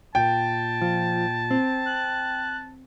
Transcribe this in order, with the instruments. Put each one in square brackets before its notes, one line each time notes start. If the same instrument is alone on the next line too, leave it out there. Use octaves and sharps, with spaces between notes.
[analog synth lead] A#2 [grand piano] G5 [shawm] A5
[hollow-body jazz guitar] F3
C4
[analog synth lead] F#6